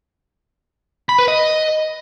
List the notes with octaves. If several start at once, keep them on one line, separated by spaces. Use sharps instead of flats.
B5
B4
D#5